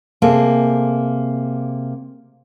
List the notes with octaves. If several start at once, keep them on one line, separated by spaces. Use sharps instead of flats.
C3 A#3 G#4 A4